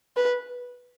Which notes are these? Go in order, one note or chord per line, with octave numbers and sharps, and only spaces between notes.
B4